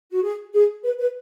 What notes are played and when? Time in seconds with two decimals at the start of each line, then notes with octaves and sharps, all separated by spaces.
0.10 F#4
0.22 G#4
0.53 G#4
0.84 B4
0.99 B4